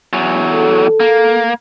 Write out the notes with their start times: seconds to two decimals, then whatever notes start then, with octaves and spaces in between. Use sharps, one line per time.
0.13 E2 F#3
0.51 A4
1.00 A#3